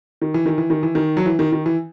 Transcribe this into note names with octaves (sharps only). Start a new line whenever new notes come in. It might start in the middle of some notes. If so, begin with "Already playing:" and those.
D#3
E3
D#3
E3
D#3
E3
D#3
F#3
E3
D#3
D#3
E3